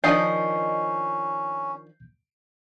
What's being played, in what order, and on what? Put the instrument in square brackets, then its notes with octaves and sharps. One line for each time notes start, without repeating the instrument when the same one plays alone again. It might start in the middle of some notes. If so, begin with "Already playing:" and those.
[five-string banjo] D#3 F3 D4 [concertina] C#4 [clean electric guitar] D#5 [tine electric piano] G6 C7